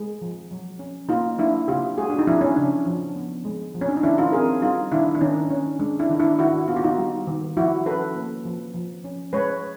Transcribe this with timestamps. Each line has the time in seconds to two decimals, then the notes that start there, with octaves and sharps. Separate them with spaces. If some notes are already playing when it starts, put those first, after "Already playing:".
Already playing: G#3
0.22 F3
0.51 F#3
0.79 C#4
1.09 A#3 D#4 F4
1.38 F#3 D4 E4
1.68 C#3 F4 G4
1.98 G#3 F#4 G#4
2.10 D4
2.19 D#4
2.27 F3 D4 E4
2.41 C#4
2.56 C#3 D4
2.86 F3
3.16 B3
3.45 G#3
3.75 F3
3.81 C#4
3.89 D4
3.97 D#4
4.03 D#3 D4 E4
4.18 D#4 F4
4.32 C4 G#4 A#4
4.62 G3 D#4 F4
4.92 D#3 D4 E4
5.15 D4
5.21 D#3 C#4 D#4
5.51 C#4
5.79 G#3 D4
5.99 D4 E4
6.10 D#3 D#4
6.19 D4 E4
6.39 D#3 E4 F#4
6.68 B3 F4
6.76 F#4
6.84 D#4 F4
6.98 G3
7.27 D#3
7.57 F3 E4 F#4
7.86 C#4 A4 B4
8.16 A#3
8.45 F3
8.74 F3
9.04 C#4
9.33 G#3 B4 C#5